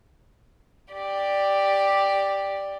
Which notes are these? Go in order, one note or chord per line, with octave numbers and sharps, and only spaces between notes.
G4 D5